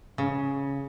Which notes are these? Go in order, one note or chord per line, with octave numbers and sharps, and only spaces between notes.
C#3